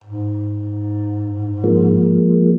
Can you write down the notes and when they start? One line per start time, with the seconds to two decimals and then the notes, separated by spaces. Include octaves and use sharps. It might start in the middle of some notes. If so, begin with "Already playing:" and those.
0.04 G#2
1.64 F3 G#3 A#3